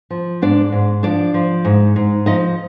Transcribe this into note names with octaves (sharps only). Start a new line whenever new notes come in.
F3
G#2 D4 D5
G#2
F3 D4 D5
F3
G#2
G#2
F3 D#4 D#5